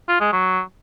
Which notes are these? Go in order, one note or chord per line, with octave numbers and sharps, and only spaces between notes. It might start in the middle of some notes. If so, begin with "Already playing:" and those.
F4
G#3
F#3